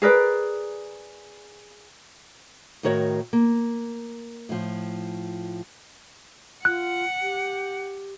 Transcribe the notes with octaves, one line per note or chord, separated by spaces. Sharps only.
G#4 A#4 B4 D5
A2 D#3 F#4 A#4 C#5
A#3
A2 F3
F4 F#5 F#6
G4